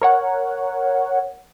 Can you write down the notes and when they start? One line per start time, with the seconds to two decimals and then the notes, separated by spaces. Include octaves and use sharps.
0.02 A#4 C#5 F#5